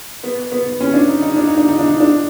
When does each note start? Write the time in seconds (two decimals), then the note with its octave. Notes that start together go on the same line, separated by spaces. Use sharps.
0.24 B3
0.52 B3
0.80 C#4
0.94 D4
1.08 D#4
1.22 D#4
1.36 D4
1.47 D#4
1.58 D4
1.68 D#4
1.79 D4
1.89 D#4
2.00 D4